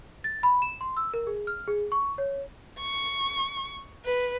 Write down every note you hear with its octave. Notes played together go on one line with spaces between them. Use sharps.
A6
B5
E7
C6
E6
A#4
G#4
F6
G#4
C#6
C#5
C#6
B4